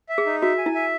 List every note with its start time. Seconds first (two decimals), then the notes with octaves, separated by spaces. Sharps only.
0.09 E5
0.18 G#4
0.26 D#4
0.42 F#4 E5
0.58 G#5
0.66 E4
0.75 E5